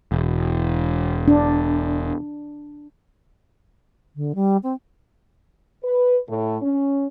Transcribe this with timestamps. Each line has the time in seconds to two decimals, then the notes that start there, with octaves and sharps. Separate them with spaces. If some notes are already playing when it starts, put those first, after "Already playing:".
0.12 E1
1.28 D4
4.15 D3
4.35 G3
4.63 C4
5.83 B4
6.28 A2
6.62 C#4